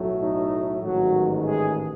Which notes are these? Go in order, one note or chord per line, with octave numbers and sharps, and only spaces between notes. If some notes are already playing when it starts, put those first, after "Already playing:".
Already playing: B1 A2 F#3 A3
D#4
A1 G#2 D#3 F#3 F#4
G#3 G#4